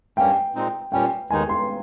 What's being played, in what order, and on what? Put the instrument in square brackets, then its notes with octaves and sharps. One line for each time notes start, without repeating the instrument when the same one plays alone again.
[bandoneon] G2 G3 A#3 C#4 [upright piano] G5
[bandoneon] A#2 G#3 C4 D#4
[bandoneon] A#2 G3 C#4 [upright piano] G5
[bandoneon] D#2 D#3 G#3 D#4 [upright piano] G#5
[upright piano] C6